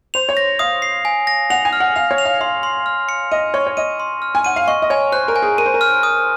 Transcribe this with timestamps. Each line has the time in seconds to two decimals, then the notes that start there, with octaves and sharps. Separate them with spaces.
0.14 C5 F7
0.29 C#5
0.37 A#6
0.59 F5 D#6
0.82 C7
1.05 G#5
1.27 A#6
1.50 F#5 F7
1.65 G#5
1.73 F6
1.80 F#5
1.96 F5 F7
2.11 C#5
2.18 F7
2.25 F5
2.41 F5 C6
2.63 C6
2.86 F6
3.09 C#7
3.31 D#5 D#7
3.54 C#5 C#6
3.67 C#5
3.77 D#5 D#7
4.00 C6
4.22 F6
4.35 G#5
4.44 F#5 D#7
4.56 F5
4.67 D#5 C#6
4.82 D#5
4.90 C#5 G#5
5.12 C5 F#6
5.28 A#4
5.36 G#5
5.42 G#4
5.58 A#4 D#7
5.66 C5
5.74 A#4
5.81 F6
6.03 D#6